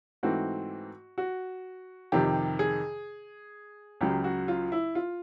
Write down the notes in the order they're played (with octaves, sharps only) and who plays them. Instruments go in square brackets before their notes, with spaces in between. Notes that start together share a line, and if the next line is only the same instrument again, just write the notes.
[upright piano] G#2 E3 A3 C4 F#4
F#4
F2 C3 D#3 G4
G#4
C#2 C#3 F#3 G4
F#4
F4
E4
F4